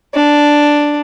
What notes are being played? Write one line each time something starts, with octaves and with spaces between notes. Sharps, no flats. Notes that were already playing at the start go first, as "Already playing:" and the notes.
D4